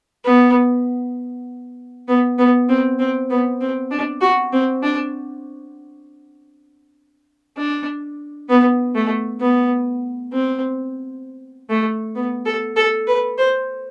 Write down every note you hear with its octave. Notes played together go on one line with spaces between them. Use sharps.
B3
B3
B3
C4
C4
B3
C4
D4
F#4
C4
D4
D4
B3
A3
B3
C4
A3
B3
A4
A4
B4
C5